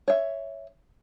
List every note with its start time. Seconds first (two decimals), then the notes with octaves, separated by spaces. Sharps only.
0.08 C#5 E5